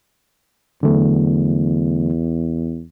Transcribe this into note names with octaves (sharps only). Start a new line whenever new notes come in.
E2 D3 F#3 A3